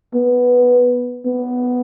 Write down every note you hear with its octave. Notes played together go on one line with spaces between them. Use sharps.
B3
B3